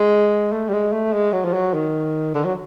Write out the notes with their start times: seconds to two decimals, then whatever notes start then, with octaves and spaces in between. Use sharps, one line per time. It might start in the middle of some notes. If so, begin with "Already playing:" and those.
Already playing: G#3
0.52 A3
0.69 G3
0.73 G#3
0.92 A3
1.13 G#3
1.33 F#3
1.45 F3
1.53 F#3
1.74 D#3
2.34 D3
2.44 F#3